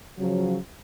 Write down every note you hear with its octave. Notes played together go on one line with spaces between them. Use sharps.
C#3 F3 F#3